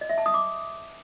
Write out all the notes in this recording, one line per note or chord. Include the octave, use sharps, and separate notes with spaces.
D#5
E5
A5
D#6
D6